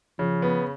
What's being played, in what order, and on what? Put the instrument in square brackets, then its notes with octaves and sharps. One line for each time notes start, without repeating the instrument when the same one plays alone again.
[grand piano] C#3 [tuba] F3
[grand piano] B3